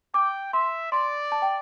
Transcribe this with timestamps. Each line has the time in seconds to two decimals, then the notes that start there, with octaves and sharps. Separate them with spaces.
0.14 G5 D6
0.53 E5 C6
0.92 D5 C6
1.32 A5
1.42 G5